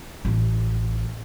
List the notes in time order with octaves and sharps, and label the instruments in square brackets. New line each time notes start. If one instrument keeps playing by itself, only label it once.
[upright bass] A1